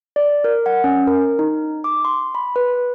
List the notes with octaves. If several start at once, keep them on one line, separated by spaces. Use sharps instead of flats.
D5
A#4
F#5
C#4
A#4
D#4
D6
C6
B5
B4